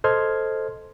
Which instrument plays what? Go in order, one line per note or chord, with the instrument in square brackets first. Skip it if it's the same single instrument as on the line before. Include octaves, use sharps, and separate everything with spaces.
[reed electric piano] A4 C5 D#5 C6 F6 G#6